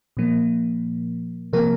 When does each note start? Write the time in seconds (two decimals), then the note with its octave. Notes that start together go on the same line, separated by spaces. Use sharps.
0.17 A#2 F3 A#3
1.53 C3 F3 A#3 A#4